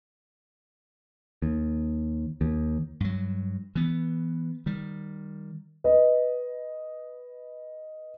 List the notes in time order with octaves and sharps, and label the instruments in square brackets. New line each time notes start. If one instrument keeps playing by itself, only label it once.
[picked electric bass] D#2
D#2
[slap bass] G2 F#3
E3 B3
D#3 G3
[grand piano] B4 D#5